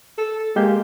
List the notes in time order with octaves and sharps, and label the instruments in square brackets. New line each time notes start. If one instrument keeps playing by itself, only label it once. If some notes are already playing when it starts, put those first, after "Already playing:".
[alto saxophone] A4
[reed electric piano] G#3 G4 G6 [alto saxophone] A#3